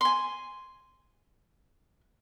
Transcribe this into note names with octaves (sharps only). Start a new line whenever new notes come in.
G#5 C6